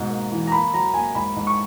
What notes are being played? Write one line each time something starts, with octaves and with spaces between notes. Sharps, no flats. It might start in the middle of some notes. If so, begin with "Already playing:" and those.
Already playing: G#2 B2
A#3
E3
A#5
A#3 B5
F#3 A#5
A#3 G#5
G#2 B5
G#2
C#6